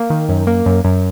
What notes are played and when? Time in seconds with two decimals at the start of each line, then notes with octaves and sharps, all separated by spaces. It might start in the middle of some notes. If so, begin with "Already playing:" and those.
Already playing: A#3
0.10 D#3
0.29 F#2
0.47 A#3
0.66 F#2
0.84 F#2